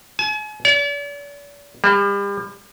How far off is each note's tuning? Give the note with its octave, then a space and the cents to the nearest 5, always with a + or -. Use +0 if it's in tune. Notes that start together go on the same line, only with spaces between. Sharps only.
G#5 +40
D5 -45
G3 +35